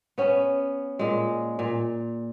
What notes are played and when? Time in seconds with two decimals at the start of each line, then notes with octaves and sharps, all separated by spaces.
0.18 B3 C#4
0.99 A#2 G#3
1.59 A#2